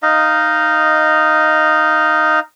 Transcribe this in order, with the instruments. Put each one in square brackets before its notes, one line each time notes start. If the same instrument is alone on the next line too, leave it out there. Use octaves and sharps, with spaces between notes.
[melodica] D#4 D#5 F5